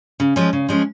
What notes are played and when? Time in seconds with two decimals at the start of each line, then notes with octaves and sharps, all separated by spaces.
0.20 C#3
0.36 F3 G#3 C#4
0.53 C#3
0.69 F3 G#3 C#4